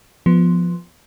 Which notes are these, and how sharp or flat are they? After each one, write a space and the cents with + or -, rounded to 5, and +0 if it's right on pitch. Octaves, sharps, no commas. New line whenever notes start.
F3 +0 B3 +0